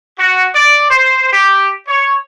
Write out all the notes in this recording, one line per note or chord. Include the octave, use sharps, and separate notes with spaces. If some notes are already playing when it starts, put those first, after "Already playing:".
F#4
D5
C5
G4
C#5